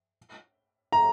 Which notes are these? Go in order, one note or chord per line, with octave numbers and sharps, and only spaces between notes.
A#5